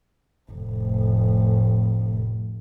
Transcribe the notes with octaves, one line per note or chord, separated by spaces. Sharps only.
F1 A2